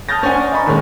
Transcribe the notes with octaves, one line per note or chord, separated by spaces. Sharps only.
A5 D#6 F6 G6 A6 A#6
C#4 D4 C5 F#5 G#5
D5
D#5 A#5 B5 C#6
D#2 A#2 D#3 G#3 C#4